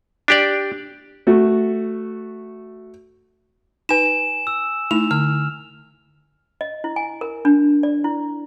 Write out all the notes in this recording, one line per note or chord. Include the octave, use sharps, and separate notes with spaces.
D4 G4 D5
A3 F#4
D#4 B4 G#5 E7
E6
A3 D#4 E4 F7
D3 F6
D#5
E4
G#5
A#4
D4
D5
E4